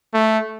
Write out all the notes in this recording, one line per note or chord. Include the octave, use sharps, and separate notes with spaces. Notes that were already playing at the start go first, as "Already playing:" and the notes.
A3